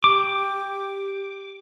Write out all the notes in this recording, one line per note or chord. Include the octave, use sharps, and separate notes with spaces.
G4 D6